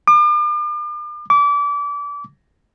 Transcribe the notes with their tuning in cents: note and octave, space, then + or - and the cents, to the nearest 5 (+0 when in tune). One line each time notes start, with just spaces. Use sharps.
D6 +40
D6 -30